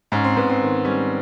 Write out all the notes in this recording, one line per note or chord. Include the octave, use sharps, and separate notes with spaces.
G#2 C#4
C4
G#2 B3
C4
D#3
G3 C#4